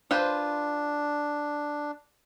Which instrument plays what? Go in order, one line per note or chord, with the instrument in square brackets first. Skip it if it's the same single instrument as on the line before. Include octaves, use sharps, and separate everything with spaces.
[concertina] D4 [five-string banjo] F4 B4 C5